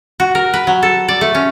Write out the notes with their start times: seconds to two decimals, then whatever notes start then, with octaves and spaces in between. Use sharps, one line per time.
0.20 F#4
0.35 A#4
0.54 B4
0.67 F#3
0.83 A4
1.08 D5
1.21 A3
1.35 C#4